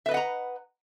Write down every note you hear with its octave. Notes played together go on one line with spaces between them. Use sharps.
B4 D#5 E5 F#5 A#5